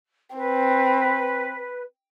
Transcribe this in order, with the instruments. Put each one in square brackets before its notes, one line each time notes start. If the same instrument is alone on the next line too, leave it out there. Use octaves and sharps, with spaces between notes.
[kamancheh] C4 [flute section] B4